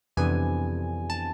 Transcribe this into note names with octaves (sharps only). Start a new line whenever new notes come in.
F2 C3 E3 B3 D4 G#5
A5